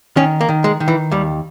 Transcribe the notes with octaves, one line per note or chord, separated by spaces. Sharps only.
D#3 C#4
A#3
D#3
G#3
D#3
E3
D#2 G3